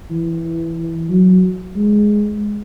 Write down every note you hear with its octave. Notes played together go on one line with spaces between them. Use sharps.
E3
F#3
G#3